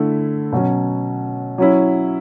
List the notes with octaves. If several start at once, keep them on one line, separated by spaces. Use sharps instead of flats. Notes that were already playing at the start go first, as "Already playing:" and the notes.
Already playing: D3 A3 E4
B2 F#3 C#4
F#3 C#4 E4